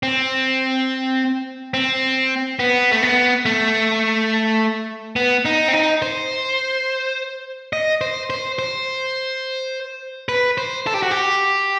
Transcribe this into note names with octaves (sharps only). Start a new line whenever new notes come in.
C4
C4
B3
A3
B3
A3
B3
D#4
C4
D#4
C5
D#5
C5
C5
C5
B4
C5
A4
G4
F#4
G4